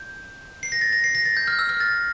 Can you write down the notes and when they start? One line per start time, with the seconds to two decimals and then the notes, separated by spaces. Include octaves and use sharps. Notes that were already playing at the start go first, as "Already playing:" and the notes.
Already playing: G6
0.63 C7
0.72 A#6
0.81 A6
0.93 A#6
1.04 C7
1.15 A#6
1.26 A6
1.37 G6
1.48 F6
1.59 E6
1.69 F6
1.80 A6